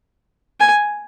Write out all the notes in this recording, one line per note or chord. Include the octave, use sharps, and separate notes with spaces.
G#5